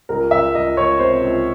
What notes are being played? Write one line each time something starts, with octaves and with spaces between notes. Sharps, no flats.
C#2 A#4
C#2 E5
C#2 D#5
C#2 C#5
C3 C5
C#2